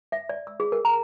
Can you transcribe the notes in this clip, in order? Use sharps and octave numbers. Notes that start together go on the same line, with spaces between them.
E5
D5
E6
G#4
A#4
A#5